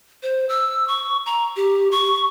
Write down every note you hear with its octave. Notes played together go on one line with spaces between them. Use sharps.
C5
E6
C#6
A#5
G4
C#6